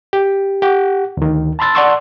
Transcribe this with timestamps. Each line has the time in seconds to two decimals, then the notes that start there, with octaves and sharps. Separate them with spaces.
0.13 G4
0.62 G4 F#5
1.17 D2 D#3
1.59 A5 B5 C6 E6 A6
1.75 D5 F#5 A5 C6 C#6 E6